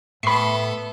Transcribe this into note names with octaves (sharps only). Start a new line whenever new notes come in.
A2 B3 A4 E5 B5 C#6 C7